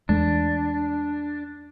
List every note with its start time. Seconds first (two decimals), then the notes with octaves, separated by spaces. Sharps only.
0.09 E2 G#3 A3 D4